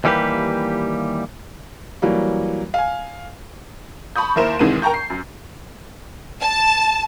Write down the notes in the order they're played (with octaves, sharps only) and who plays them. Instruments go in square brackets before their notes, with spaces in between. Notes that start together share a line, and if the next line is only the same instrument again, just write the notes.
[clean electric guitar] D#2 E3 G3 A#3 G4 B4
[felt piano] E3 F#3 G3 A#3
F5 G#5
[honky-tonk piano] A5 B5 C#6 D#6 G6
D#2 E4 A#4 C5 E7
C2 D#3 E3 G#3 C4 D#7
A#4 G5 A5 A#5 C#6 G6
C7
F#2
[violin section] A5